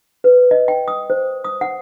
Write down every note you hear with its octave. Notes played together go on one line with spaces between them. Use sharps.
B4
D#5
G5
D#6
C5
D#6
F#5